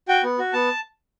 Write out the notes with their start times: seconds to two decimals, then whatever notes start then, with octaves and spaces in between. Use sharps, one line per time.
0.08 F#4 G5
0.24 B3
0.38 F#4
0.53 B3 A5